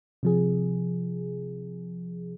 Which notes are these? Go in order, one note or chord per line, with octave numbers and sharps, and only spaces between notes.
C3 F3 G#4